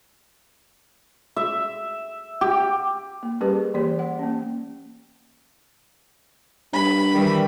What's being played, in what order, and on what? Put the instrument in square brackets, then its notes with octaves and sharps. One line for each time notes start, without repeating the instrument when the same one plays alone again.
[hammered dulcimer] E5
G4
[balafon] A#3
G3 C#4 G4 G#4 A#4 B4
E3 A#3 G4 D5
F#5
A#3 C#4
[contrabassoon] G2 [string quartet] B5
[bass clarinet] D#3 [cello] E3 G3